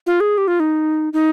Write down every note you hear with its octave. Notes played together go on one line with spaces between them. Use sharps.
F4
G#4
G4
F4
D#4
D#4